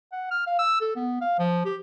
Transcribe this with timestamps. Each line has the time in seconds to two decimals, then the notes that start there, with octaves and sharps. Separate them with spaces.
0.12 F#5
0.31 F6
0.47 F5
0.59 E6
0.81 A4
0.96 B3
1.21 F5
1.39 F3
1.65 G4